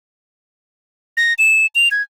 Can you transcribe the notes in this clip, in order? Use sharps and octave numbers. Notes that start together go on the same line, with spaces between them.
A#6
E7
F7
G#6